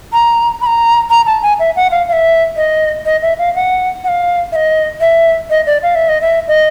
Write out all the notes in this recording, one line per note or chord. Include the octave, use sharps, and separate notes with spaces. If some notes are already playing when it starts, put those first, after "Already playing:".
A#5
B5
A#5
A#5
A5
G#5
E5
F#5
F5
F5
E5
D#5
D#5
E5
F5
F#5
F#5
F5
E5
D#5
E5
D#5
D5
F5
E5
D#5
E5
D#5